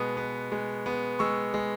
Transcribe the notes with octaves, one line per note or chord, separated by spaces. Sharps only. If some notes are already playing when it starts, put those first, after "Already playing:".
Already playing: B2 G#3 B3 D#6
B3
G#3
B3
G#3 C#6 E6
G#3